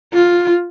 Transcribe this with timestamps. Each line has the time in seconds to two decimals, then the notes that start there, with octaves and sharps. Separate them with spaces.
0.14 F4